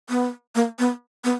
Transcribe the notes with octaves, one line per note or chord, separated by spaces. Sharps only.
B3
A#3
B3
B3